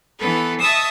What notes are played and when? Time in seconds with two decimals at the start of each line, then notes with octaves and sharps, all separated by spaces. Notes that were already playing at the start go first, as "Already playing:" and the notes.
0.17 E3 B3 A4 B4
0.59 D#5 E5 A5 C#6 D#6 E6